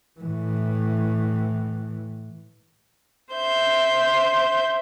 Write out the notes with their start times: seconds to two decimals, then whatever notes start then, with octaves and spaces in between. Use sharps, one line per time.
0.20 A2 E3
3.34 C5 E5 G6